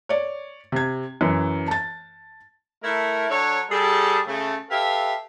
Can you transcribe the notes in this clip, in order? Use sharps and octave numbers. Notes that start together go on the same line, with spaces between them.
C#5 D5
C3 G#6
F#2 E3
A5 A6
A3 E4 A#4
F#3 D4 A4 C#5
G3 G#4 A4
C#3 A3
G4 A4 B4 E5 F5